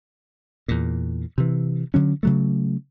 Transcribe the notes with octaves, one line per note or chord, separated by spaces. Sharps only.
E2 A#2
C3 E3
D3 F#3 C#4
C#3 F#3 A3